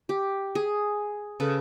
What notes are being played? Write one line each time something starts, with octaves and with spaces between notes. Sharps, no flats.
G4
G#4
C#3 A4 B4